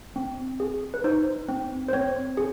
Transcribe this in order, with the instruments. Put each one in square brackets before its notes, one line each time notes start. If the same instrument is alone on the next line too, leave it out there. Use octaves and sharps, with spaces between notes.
[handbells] C4
G#4
B4
D#4 C5
C4
C5
C4 C#5
G#4